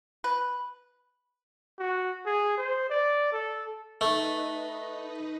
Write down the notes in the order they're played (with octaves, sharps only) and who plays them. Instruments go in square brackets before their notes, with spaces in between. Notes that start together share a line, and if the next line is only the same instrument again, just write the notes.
[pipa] B4
[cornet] F#4
G#4
C5
D5
A4
[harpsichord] A3 [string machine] D#4 B4 D#5